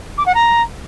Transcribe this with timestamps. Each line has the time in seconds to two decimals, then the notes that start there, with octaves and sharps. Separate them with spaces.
0.17 D6
0.26 F#5
0.34 A#5